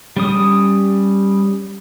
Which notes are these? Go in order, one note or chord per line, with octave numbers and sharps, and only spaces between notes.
G3 C#4 D#6